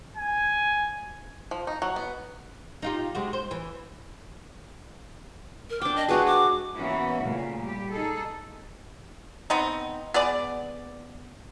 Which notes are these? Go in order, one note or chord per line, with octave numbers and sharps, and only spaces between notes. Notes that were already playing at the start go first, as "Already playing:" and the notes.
G#5
F3
D#4
F#3
B3
D#4 F4 G4
C3 G#3 F#4
C5
E3
A#4
D4 G5 D6
D#5
G#3 F#4 G#4 B4
D6
E3 A#3 B3 C#4 E4 F#4
A#2 C#3 A3
G3 G4
D#4 G#4 A4
B3 C4 D#4
B3 G#4 D5